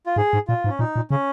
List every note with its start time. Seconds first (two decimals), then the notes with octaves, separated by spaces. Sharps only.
0.06 F4
0.16 G#2 G#4
0.33 G#2
0.48 A#2 F4
0.64 G#2
0.69 C#4
0.79 A#2 D#4
0.96 A#2
1.11 C#3 C#4